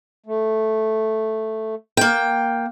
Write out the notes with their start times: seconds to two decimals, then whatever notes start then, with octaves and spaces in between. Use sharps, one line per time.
0.26 A3
1.97 A#3 G5